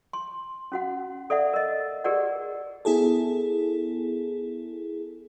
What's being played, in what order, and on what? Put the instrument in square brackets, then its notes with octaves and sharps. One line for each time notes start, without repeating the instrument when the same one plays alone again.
[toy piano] C6
C#4 F#4 F#5
A4 D5 E5 F#5
A#4 D#5
G4 G#4 A#4 B4 D5 F#5
[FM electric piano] B3 E4 G#4 A4